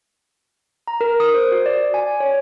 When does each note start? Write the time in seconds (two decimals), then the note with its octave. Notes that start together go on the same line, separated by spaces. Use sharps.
0.87 A#5
1.01 A#4
1.20 D#6
1.34 C5
1.52 F#4
1.66 D5
1.78 D5
1.94 G#5
2.20 C#5